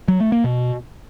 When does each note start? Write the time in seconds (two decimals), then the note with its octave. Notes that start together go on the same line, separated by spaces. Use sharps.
0.08 F#3
0.20 A3
0.32 A#3
0.44 B2